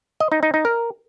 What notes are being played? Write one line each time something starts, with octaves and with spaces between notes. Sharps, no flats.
D#5
D#4
D#4
D#4
A#4